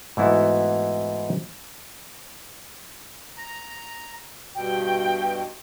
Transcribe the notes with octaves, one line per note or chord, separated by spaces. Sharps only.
G#2 E3 A3 B3 E4 F#4
A#5
G2 B2 G5